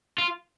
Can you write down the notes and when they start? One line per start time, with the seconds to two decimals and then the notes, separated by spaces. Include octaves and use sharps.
0.18 F4